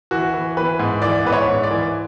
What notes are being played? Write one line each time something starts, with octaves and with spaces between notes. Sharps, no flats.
E3 F#4
E3
E3 B4
G#2
E3 D5
G#2 B4
C#5
G#2
D5
E3